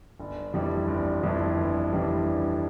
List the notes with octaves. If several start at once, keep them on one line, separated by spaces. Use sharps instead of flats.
G1
F2 E3 G3 D4
G1
F2 E3 G3 D4
G1
F2 E3 G3 D4
G1